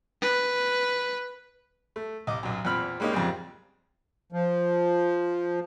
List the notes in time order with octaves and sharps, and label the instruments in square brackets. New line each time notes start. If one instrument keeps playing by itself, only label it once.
[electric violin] B4
[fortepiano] A3
C2 D#5 D6
B1 F#2
E2 A#2 C4 B5 F6
G3 G#3 A#3 C#4 D#4
F2 G#2 C#3 G3 C4
[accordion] F3